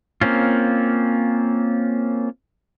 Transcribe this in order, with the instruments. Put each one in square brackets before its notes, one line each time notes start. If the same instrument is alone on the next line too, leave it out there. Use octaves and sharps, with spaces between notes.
[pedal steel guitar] A#3 C4 C#4 F4